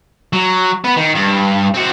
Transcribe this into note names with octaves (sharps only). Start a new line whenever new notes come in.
F#3
B3 B4
D#3
G2
C4 F#4